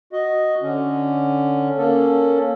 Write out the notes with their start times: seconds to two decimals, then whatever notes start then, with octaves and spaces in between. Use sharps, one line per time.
0.13 F#4 D#5
0.62 D3 C#4
1.78 A#3 C#4 A4